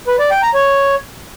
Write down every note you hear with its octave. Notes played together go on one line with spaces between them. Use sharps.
B4
D5
G5
A#5
C#5